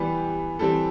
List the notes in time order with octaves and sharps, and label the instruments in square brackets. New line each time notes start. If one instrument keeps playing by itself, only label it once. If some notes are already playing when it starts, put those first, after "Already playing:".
Already playing: [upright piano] E3 G3 B3 G4
E3 G3 C4 A4